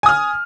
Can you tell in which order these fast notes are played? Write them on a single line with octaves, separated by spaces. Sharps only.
G#5 D#6 F6